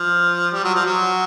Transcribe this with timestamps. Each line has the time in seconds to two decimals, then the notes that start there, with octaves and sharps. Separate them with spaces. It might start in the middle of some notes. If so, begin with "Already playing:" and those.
Already playing: F3
0.52 G3
0.63 F#3
0.75 F3
0.86 F#3